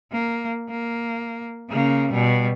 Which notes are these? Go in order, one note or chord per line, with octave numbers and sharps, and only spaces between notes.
A#3
A#3
C#3 A#3
B2 G3